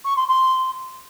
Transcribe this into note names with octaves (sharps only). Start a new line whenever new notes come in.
C#6
C6
C6